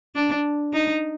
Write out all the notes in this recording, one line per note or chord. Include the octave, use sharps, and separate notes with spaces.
D4
D#4